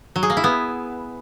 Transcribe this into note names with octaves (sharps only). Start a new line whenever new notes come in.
F#3
G#4
A#3
E4
B3